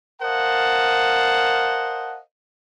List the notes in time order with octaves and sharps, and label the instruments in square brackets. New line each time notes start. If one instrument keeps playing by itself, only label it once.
[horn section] A#4 C5 D#5 F5 F#5 A5